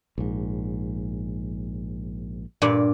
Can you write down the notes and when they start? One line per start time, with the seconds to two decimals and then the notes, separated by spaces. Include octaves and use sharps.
0.18 A#1 G#2
2.62 G2 A#2